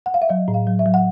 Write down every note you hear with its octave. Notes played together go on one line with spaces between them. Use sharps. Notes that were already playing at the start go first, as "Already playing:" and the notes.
F#5
F5
E5
F#3 D#5
A2
F5
F#3
E5
F#3
F#5